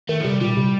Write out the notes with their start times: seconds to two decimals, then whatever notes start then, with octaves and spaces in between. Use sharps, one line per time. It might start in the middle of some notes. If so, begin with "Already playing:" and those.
0.09 D#3 A3
0.21 F3
0.24 C3 G3
0.41 A#2 G3
0.57 C3